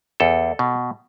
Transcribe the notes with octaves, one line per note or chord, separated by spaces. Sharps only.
E2 A4
B2